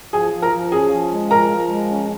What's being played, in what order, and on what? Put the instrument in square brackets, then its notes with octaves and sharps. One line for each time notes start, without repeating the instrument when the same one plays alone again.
[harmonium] F3 [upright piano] G#4 G#5
[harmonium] F3
[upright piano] A#4 A#5
[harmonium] F3
[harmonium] C#4 [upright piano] G#4 G#5
[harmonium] F3
G#3
[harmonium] F3 [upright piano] A#4 A#5
[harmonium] F3
G#3
C#4